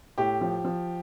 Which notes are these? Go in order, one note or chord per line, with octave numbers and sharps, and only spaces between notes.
A2 G4
F3
F3